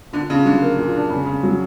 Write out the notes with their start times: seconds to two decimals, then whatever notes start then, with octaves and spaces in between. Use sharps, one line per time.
0.12 A#2 D3
0.29 C#3 D4
0.45 D3 F#3
0.62 A#3
0.78 A#2
0.94 D4
1.10 C#3
1.26 C#3
1.43 F#3